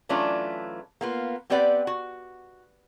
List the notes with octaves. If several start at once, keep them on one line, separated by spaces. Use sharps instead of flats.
E3 F#3 A3 C#4 D4 F4
A#3 B3 F4
B3 C4 G4 B4 D5 F#5
F#4